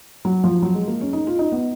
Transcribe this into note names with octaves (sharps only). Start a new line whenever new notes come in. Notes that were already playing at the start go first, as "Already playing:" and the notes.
F#3
F3
F#3
G#3
A#3
C#4
D#4
F4
D#4
B3